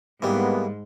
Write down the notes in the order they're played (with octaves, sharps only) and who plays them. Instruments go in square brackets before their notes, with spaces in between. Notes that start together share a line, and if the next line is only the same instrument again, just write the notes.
[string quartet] G#2 [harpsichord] E3 G3 [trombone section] G#3 A#3 B3